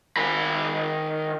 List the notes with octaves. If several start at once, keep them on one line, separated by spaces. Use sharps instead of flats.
D#3 B5